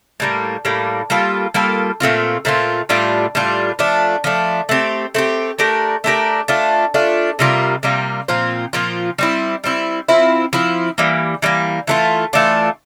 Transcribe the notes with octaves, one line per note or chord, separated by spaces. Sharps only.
A2 G3 A#3
A2 G3 A#3
G3 A#3 F4 A4
G3 A#3 F4 A4
A#2 A3 C4 F4
A#2 A3 C4 F4
A2 G3 D4 F4
A2 G3 D4 F4
F3 A3 D4
F3 A3 D4
A3 C4 G4
A3 C4 G4
A3 D4 G4 A#4
A3 D4 G4 A#4
A3 D4 F4
A3 D4 F4
C3 G3 A#3 F4
C3 G3 A#3 F4
A#2 F3 C4 F4
A#2 F3 C4 F4
G3 C4 E4
G3 C4 E4
F3 C4 E4
F3 C4 E4
E3 G3 A#3
E3 G3 A#3
E3 A3 D4 F4
E3 A3 D4 F4